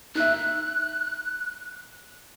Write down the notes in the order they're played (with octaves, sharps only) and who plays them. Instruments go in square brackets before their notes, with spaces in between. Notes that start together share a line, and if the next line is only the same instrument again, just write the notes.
[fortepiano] D#4 E5 [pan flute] F#6